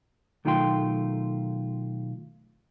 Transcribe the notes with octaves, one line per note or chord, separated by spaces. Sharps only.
B1 D#3 A3 F4 G5 C6